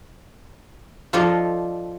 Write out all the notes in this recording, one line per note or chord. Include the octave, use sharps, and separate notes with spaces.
F3 F4 A4 C5 D5 D#5